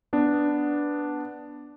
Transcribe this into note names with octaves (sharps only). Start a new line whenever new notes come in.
B3 D4